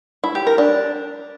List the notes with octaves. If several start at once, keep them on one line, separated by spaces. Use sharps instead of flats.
E4
G4
A#4
D4